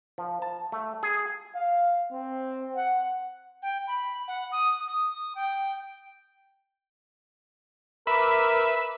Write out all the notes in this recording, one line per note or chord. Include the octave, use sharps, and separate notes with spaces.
F3
A5
A3
G#4
F5
C4
F#5
G5
B5
F#5
D#6
D#6
G5
A#4 B4 E5 B5 D6